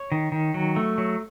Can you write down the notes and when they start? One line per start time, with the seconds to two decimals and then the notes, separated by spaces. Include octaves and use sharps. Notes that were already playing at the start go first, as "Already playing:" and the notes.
Already playing: C#5
0.12 D#3
0.32 D#3
0.54 F#3
0.76 A3
0.98 F#3